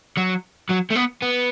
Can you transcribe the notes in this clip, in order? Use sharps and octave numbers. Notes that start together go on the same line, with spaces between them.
F#3
F#3
A3
B3
B3